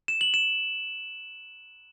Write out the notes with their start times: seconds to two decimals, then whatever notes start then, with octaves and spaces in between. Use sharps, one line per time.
0.08 E7
0.21 F#7
0.34 E7